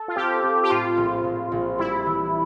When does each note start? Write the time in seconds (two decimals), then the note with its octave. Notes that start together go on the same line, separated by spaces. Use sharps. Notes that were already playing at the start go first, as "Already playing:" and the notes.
Already playing: A4
0.08 F4
0.16 C4 G4
0.43 C4
0.64 G4
0.70 A2 F4
0.97 A#1
1.24 A#1
1.52 A#1
1.78 G3 E4
2.06 E3